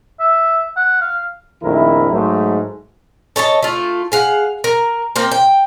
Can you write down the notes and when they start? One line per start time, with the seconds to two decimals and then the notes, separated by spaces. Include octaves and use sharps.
0.20 E5
0.77 F#5
1.01 F5
1.63 A#1 F2 D#3 A3 E4 A#4
2.11 G#2 F#3 A3
3.36 A4 C#5 D#5 A5
3.63 A3 F4
4.12 G#4 F5 F#5
4.64 A#4
5.16 A#3 C4 F5 G5
5.31 G5